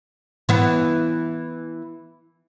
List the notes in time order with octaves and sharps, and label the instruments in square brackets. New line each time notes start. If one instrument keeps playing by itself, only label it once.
[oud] E3 B3